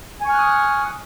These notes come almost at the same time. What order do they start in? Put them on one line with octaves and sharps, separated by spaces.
G#5 C#6 F6 F#6 D#6